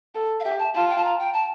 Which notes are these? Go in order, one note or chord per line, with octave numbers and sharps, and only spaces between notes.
A4
F5
G4 E5
A5
F4 A5
G5
A5
A#5
G5
A5